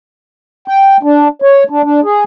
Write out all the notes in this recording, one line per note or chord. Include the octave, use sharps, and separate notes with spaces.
G5
D4
C#5
D4
D4
G#4